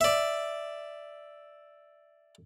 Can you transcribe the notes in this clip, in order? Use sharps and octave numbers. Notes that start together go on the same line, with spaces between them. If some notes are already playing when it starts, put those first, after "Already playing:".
D5 E5